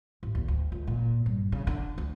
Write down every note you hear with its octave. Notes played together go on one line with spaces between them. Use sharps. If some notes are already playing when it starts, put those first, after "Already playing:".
A1
D#2
D2
C#2
A#2
G2
C#3
D3
D2